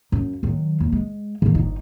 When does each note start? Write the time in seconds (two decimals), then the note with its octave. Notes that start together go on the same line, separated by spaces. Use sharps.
0.12 F#2
0.43 D#3 F#3
0.80 D#2
0.92 G#3
1.42 D3 D#3
1.55 G1 D#4